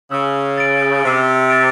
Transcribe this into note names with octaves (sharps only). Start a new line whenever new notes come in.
C#3 E6
A6 D7
C3 E6
A6 D7